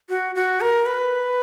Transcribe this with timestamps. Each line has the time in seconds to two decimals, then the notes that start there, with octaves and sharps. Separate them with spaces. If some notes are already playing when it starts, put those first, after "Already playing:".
0.09 F#4
0.35 F#4
0.61 A#4
0.86 B4